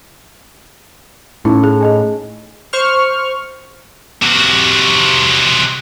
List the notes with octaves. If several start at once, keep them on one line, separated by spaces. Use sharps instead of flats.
A2 C#4 D#4 E4
G#4
G#4 D#5 G#5
C5 C#6 F6
C3 F#4